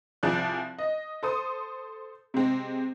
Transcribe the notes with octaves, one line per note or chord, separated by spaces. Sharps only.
C2 F3 G#4 D5 F#6
D#5
A4 C5 D#6
C3 G#3 C4